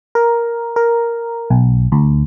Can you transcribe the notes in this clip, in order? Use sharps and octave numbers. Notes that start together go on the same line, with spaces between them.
A#4
A#4
B1
D2